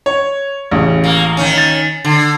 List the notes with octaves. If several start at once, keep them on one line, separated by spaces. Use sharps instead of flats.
C#5
A1 C#3
A#3
D#3 C#4
A6
D3